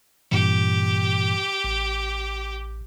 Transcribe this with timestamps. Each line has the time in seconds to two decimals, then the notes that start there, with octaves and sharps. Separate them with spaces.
0.32 G2 A#2 E3 G4
1.64 A1